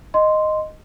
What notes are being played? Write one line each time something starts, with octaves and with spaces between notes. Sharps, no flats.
D#5 C6